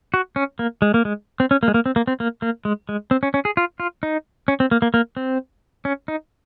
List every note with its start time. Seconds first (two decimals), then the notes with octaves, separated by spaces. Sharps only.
0.14 F#4
0.36 C#4
0.59 A#3
0.82 G#3
0.94 A#3
1.05 G#3
1.40 C4
1.51 C#4
1.63 A#3
1.68 G#3
1.74 A#3
1.86 C4
1.96 A#3
2.07 C4
2.20 A#3
2.42 A#3
2.65 G#3
2.89 G#3
3.11 C4
3.23 C#4
3.34 C#4
3.45 G#4
3.57 F4
3.80 F4
4.03 D#4
4.48 C#4
4.60 C4
4.71 A#3
4.82 A#3
4.94 A#3
5.17 C4
5.85 C#4
6.08 D#4